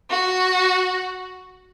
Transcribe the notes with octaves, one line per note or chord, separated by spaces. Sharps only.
F#4